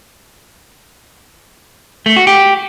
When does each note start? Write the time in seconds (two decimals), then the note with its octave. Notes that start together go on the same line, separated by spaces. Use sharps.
2.06 A3
2.16 F#4
2.27 G4